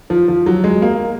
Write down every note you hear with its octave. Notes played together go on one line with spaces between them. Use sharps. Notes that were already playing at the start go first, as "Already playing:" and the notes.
F3
F3
F#3
G#3
A#3